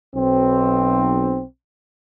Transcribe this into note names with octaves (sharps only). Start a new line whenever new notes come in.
B1 C4